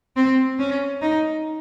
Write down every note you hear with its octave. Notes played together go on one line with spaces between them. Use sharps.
C4
C#4
D#4